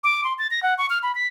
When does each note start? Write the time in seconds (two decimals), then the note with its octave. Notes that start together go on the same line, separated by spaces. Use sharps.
0.04 D6
0.24 C6
0.39 A6
0.51 A#6
0.63 F#5
0.78 C#6
0.90 F6
1.03 B5
1.15 B6